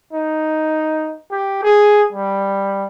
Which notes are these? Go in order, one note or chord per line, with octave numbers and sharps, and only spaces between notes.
D#4
G4
G#4
G3